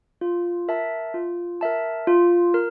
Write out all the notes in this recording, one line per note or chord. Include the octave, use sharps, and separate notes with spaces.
F4
A#4 E5 A5
F4
A#4 E5 A5
F4
A#4